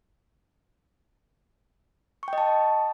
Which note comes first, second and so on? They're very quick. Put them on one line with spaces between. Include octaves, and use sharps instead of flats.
C#6 G5 D#5 A5